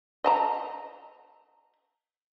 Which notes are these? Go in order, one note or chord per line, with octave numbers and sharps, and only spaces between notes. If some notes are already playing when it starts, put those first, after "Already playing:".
D#5 A5 A#5